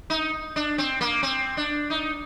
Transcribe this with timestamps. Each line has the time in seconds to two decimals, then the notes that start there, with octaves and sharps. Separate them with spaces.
0.10 D#4
0.56 D4
0.78 C4
1.01 A#3
1.23 C4
1.57 D4
1.90 D#4